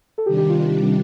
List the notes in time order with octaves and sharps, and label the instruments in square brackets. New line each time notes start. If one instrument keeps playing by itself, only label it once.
[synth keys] A4
[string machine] C3 D#3 G3 D4 [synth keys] G4
[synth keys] G4
F4
F4